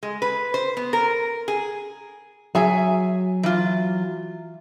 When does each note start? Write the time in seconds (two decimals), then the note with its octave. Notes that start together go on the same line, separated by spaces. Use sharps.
0.03 G#3
0.22 B4
0.54 C5
0.77 B3
0.93 A#4
1.48 G#4
2.55 F#3 G#4 E5 G#5
3.43 E3 F4